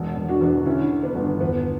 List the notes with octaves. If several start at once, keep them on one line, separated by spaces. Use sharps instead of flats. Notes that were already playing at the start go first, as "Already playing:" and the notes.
Already playing: E1 B2
E1
D4 F#4
E2
D3 C#4 E4
D3
B3 D4
G1
E2 B3